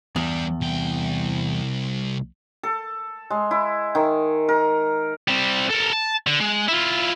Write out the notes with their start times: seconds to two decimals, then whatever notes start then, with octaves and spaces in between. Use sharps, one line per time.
0.16 E2 G3 D4
0.61 C2 G5
2.63 A4
3.30 G#3
3.51 E4
3.95 D#3
4.49 A#4
5.28 G3 C4
5.70 A4 A#4
5.92 A5
6.27 D3
6.40 G#3
6.68 E4 F4